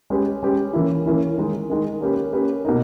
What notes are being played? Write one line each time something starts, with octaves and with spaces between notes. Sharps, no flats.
G#3 C#4 G4 B4
G#3 C#4 G4 B4
E3 A#3 C#4 E4
E3 A#3 C#4 E4
D#3 G#3 D#4
D#3 G#3 D#4
A#3 C#4 G4 B4
A#3 C#4 G4 B4
B2 A#3 D#4